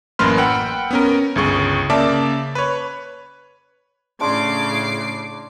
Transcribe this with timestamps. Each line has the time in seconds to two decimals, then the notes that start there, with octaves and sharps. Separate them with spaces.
0.19 A1 F#2 A#3 B4 C6 F6
0.38 F#5 G5 B5 E6
0.91 B3 C#4 A#4
1.36 G1 C#2 G#4 C#6
1.90 C#3 A#3 D5 E5 A5 D6
2.55 B4 C#5
4.21 A2 C#3 D4 C6 D6 C7